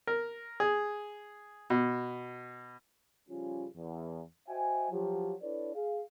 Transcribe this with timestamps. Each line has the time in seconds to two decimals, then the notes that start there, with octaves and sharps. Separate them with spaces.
0.07 A#4
0.60 G#4
1.70 B2
3.29 C#3 F3 G3 C#4 F4
3.77 E2
4.49 F#4 C5 D#5 E5 G5 G#5
4.91 F3 F#3 G4
5.42 D4 E4 A4 B4 C#5 D5
5.75 G#4 F5